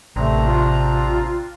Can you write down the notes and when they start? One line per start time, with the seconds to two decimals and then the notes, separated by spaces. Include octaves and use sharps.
0.16 A1 C3 A3 C4 D4 A#5
0.47 F4